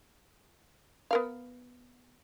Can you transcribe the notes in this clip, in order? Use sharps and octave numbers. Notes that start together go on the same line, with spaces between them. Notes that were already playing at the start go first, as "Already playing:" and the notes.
B3 A#4 F5